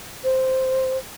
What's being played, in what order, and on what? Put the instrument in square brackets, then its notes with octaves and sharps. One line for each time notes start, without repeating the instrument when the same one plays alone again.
[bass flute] C5